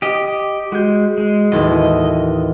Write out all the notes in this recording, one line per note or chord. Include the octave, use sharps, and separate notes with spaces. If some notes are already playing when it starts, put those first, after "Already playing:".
G4 D#5
G#3 F#4 G6
G#3
A1 D#2 E3 D#5